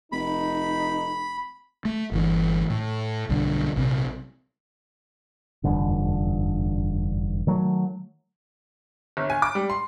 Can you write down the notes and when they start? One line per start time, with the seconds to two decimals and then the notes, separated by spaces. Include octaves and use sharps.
0.12 F1 D#4 B5
1.85 A3
2.12 G1 E3
2.70 A2
3.29 B1 G2 D3
3.76 A#1 C3
5.64 F1 E2 G2 D3
7.47 D#3 F#3 A3
9.17 G1
9.30 G#5
9.42 D6
9.55 G3
9.70 C6